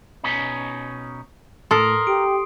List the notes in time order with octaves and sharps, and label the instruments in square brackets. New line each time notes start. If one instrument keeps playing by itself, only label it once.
[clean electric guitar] B2 C#4 D#4
[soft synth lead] A2 [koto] A4 [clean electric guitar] A#4 [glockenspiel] C6 D#6 C7
[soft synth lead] G4 [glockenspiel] D7